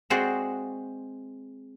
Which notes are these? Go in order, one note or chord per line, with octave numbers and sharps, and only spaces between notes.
G#3 C4 F#4 C5 D5